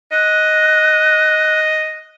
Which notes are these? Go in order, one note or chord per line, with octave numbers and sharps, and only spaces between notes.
D#5 F#6